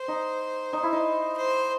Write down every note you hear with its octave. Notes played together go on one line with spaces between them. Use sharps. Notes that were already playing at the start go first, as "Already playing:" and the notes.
Already playing: C5
D#4
D#4
E4
D#4
C5